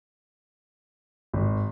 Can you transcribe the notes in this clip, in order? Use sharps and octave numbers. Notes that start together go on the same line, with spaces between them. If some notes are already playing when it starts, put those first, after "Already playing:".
G#1